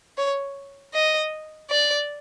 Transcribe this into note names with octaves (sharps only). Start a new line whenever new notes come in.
C#5
D#5
D5